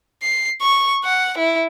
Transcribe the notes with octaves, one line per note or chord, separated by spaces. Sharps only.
C7
C#6
F#5
E4